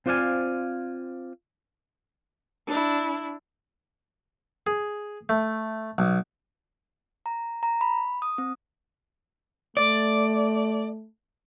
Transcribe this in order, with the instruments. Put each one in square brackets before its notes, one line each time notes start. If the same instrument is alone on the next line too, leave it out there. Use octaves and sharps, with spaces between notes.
[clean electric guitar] C4 F4 C5 D5 F5 G#5
[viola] D4 E4
[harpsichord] G#4
A3
B1
[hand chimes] A#5
A#5
B5
D#6
C4
[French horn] A3 [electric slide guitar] D5